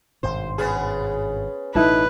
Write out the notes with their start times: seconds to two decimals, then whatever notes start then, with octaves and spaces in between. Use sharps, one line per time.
0.23 G#1 G2 B2 C5
0.58 B3 C#4 G#4
1.75 A1 B2 D#4 E4 A4 B4